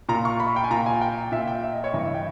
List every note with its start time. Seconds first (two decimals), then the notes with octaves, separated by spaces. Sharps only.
0.09 A#2 A#5
0.25 C#6
0.40 B5
0.56 G5
0.64 G#5
0.71 A#2 A#5
0.86 G#5
1.01 G5
1.32 A#2 E5
1.47 G5
1.63 E5
1.73 D#5
1.84 C#5
1.93 G2 E3 D#5
2.04 E5
2.14 G5